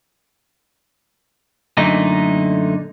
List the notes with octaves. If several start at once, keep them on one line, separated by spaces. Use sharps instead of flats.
F#2 A#2 D3 A3 D#4